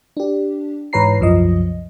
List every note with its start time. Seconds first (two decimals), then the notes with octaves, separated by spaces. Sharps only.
0.17 D4 G4
0.93 G#2 E3 B4 C#5 A#5 C7
1.20 C2 F#2 F3 D#5